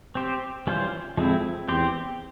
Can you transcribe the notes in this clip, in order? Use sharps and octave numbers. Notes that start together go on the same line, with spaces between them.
C4 G4 C5
E3 G3 C#4 F4 C5
F2 F3 G#3 C4 E4
E2 C4 G4 C5